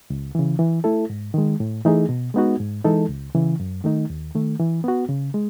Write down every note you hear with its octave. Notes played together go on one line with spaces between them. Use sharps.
C#2
C#3 E3
E3
A3 E4 A4
G#2
D#3 G#3
A2
E3 A3 D#4 G#4
B2
G#3 B3 D#4 F#4
G#2
E3 G#3 D#4 A4
C#2
C#3 E3
F#2
D#3 A3 D#4
D#2
D#3 A3
E3
B3 F#4
C#3
G#3